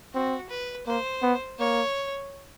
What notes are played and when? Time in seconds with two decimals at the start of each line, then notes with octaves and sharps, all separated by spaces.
0.14 C4 F#4
0.50 B4
0.86 A#3 C5
1.22 B3
1.59 A#3 C#5